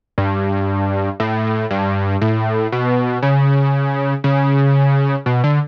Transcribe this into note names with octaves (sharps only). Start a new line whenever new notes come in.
G2
A2
G2
A2
B2
C#3
C#3
B2
D3